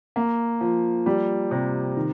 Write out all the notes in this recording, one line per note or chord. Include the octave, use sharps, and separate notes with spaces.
A#3
F3
G3
C3
D#3